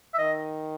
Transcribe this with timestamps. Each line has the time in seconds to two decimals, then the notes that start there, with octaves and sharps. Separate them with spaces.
0.14 E5
0.18 D#3 D#5